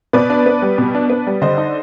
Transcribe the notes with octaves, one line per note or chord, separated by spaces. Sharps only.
B2 B4 D5
D4
B3
G3
B2
D4
B3
G3
D3 C5 D#5
D#4